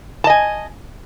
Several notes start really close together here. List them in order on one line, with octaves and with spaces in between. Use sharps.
A5 D#5 G#5